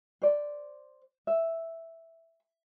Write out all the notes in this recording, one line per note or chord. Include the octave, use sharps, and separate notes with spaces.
C5 D5
E5